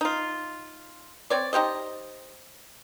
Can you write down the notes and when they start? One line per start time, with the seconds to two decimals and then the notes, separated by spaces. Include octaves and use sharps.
0.01 D#4 F4
1.30 C4 C#5 D5
1.53 D#4 G4 C5 D#5